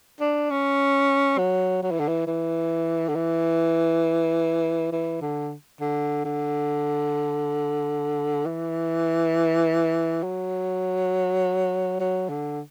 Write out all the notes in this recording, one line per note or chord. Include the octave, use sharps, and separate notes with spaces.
D4
C#4
F#3
F#3
E3
D3
E3
E3
D3
E3
E3
D3
D3
D3
E3
F#3
F#3
D3